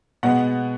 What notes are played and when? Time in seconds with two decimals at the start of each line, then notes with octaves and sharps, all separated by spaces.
0.23 B2 G#3 B3 F#5